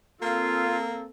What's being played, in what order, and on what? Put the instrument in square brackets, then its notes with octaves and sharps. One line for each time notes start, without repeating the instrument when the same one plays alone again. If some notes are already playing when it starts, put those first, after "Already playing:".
[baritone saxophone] A#3 [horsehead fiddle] C4 A4 [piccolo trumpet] F4